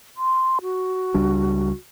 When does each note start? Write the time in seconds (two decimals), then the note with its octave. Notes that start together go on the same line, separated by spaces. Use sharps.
0.17 C6
0.62 F#4
1.14 C#2 G3 D4